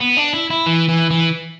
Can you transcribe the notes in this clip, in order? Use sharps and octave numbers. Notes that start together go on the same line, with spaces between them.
B3
D4
E4
E4
E3
E3
E3